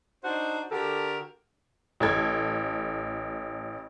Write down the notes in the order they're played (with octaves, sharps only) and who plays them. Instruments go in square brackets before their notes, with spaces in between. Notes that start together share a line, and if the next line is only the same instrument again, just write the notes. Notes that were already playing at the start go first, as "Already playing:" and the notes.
[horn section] D4 D#4 F#4 C5
D3 F#4 G4 A4 A#4
[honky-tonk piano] A1 A4 G#6